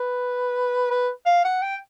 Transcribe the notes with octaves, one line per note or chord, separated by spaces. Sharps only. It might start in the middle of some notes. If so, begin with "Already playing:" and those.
Already playing: B4
B4
F5
F#5
G5